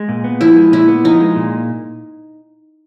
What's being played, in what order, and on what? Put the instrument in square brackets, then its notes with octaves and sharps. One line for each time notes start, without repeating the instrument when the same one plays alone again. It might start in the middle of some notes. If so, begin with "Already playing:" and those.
Already playing: [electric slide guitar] G#3
A#2
B3
[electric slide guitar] F3 [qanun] E4
[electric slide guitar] G#3
[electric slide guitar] A#2 [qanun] E4
[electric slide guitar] B3
[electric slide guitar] F3 [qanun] D#4
[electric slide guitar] G#3
A#2